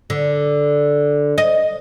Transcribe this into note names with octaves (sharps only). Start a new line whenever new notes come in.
D3
D#5